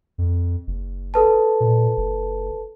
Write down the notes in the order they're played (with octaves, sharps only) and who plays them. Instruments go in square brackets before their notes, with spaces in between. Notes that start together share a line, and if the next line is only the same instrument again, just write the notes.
[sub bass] F2
F#1
[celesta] A4 B4 A5
[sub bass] A#2
F#1